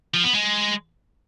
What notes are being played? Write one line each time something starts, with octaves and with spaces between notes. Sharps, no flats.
F3
B3
G#3